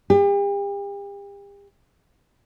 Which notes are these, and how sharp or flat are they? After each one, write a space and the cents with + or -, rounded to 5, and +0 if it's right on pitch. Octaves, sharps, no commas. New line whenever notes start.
G4 +40